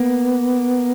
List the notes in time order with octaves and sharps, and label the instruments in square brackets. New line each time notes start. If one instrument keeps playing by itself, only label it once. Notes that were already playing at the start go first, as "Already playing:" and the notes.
Already playing: [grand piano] A#3 [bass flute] B3